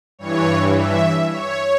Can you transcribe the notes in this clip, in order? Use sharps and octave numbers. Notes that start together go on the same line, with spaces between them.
G2 E3 C#5
E5
C#5